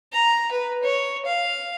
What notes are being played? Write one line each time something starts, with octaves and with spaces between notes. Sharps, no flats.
A#5
B4
C#5
F5